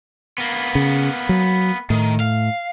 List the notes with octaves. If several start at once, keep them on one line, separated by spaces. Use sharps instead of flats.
A#3 B3
C#3
F#3
A2 D#3
F5